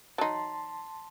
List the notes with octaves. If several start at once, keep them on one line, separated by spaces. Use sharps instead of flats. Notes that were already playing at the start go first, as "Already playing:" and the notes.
F#3 D#4 A5 C6